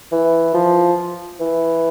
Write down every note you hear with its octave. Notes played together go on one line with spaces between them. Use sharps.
E3
F3
E3